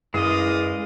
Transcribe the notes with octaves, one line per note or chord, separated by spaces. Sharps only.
F#2 E3 G#3 D5 D#5 F5 D#6